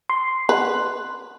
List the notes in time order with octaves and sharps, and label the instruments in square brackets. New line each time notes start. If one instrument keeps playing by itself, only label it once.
[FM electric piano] C6
[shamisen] B4